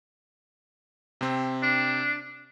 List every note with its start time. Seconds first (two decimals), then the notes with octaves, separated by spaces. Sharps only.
1.21 C3 C4
1.63 D4